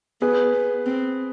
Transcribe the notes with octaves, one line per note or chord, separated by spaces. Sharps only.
B3 G#4 B4
B3
C4